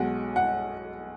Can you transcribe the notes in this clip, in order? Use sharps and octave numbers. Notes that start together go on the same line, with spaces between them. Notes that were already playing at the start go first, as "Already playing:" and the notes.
Already playing: B1 B2 G#3 F#5
F#5